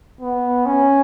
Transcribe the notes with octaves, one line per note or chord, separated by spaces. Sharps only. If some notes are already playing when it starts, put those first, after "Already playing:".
B3
C#4